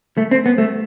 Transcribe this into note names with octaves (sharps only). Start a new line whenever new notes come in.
A3
C4
B3
A3